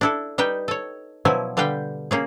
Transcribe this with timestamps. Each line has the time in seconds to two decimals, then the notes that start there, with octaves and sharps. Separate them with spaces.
0.01 D4 E4 A4
0.38 G3 D#4 B4 G5
0.68 A4 C#5
1.25 B2 F3 F#3 E4 G#5
1.57 D3 G3 B4 F5 G5
2.11 A#3 C#4 G#4